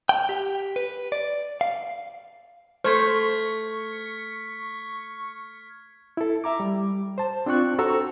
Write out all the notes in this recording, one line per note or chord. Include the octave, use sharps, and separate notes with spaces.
G5
G4
B4
D5
F5
A3 C5 C#6 F6 G#6 B6
E4 A4
E5 A#5 D6
G3
C5 A5
C4 D4 F4 G5 C#6 F#6
F#4 A4 C5 A#5 C#6 E6